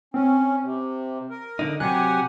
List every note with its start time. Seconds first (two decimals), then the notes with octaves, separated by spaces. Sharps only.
0.14 C4 C#4
0.63 C3
1.30 A#4
1.59 D3 D#4
1.80 C3 F#3 G4 F#5 G#5 F#6